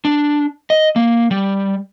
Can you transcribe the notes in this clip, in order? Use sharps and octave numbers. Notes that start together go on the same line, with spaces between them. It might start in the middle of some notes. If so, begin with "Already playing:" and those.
D4
D#5
A#3
G3